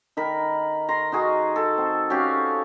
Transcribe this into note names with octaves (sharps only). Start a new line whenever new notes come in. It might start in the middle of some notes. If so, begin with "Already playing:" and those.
D#3 A#4 B5
A#5 C6
D#4 F#4 G#4 A#4
A4
C4
C#4 F#4 G4 F5